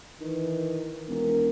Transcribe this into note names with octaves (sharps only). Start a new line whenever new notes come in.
D#3 E3
E1 A#4